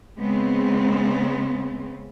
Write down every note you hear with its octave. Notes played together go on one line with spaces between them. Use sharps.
C#3 G#3 B3 C4